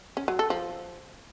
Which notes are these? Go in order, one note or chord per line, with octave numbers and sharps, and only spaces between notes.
C#4
F#3
A4
F3